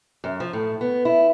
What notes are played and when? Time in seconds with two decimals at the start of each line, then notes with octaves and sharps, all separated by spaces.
0.24 F#2
0.40 F3
0.53 A2
0.81 B3
1.05 E4